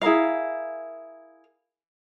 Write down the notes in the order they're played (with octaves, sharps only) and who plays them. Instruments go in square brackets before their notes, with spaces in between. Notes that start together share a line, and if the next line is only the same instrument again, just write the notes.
[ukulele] E4 G#4 A#4 F5